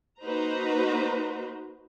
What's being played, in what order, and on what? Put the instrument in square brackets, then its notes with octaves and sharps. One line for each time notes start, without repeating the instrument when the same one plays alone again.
[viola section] A#3 D#4 F#4 B4 C5 A#5